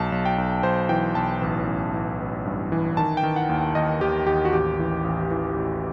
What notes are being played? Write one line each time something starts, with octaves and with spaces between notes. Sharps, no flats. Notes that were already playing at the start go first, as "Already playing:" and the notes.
Already playing: B1 A5
B1
G5
B1
B1 C5
E3 G5
B1 A5
A1
A1
A1
A1
G2
E3
D#3 A5
G5
D#3
F#5
D#2
D#2 D#5
D#2 G4
D#2 G4
F#4
A1 G4
E3
A1
E3
A1